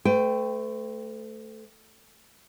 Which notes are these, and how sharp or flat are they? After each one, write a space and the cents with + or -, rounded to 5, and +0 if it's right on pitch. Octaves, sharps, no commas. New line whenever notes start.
A3 -5 B4 +45 G5 +0